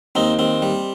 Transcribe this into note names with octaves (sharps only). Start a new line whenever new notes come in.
D#2 C4 D#4
D#2 C4
G3